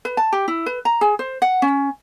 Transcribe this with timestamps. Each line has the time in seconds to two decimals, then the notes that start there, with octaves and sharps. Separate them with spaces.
0.05 B4
0.17 A5
0.32 G4
0.48 E4
0.66 B4
0.85 A#5
1.01 G#4
1.19 C5
1.42 F#5
1.62 C#4